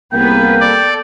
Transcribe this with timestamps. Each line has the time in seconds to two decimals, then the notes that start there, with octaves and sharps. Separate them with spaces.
0.13 C2 A#3 B3 G#4 B4 G5
0.61 A4 D5